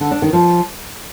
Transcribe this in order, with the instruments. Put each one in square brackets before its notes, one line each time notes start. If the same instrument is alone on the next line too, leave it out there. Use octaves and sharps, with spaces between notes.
[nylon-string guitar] D3
D4
D#3
F3